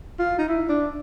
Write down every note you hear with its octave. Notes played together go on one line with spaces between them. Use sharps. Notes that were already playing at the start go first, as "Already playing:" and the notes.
F4
D#4
E4
D4